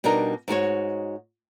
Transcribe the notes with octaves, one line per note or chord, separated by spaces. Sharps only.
B2 G3 D4 D#4 A#4
G#2 D#4 F#4 C#5